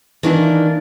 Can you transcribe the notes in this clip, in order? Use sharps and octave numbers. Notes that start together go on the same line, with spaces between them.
D#3 E3 A#3 D4